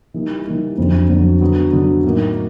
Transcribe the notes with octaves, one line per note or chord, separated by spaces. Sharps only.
E3 G3 A#3 D#4
E3 G3 A#3 D#4
F2 D3 F#3
F2 D3 F#3
D3 F#3 B3
D3 F#3 B3
A2 F#3 A#3 D#4